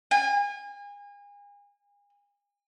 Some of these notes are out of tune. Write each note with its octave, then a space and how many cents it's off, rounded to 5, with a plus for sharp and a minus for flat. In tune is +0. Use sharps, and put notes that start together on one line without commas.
G#5 -35